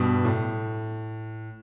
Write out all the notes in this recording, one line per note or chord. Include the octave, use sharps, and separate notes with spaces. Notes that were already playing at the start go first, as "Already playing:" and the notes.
Already playing: G2 B2
A2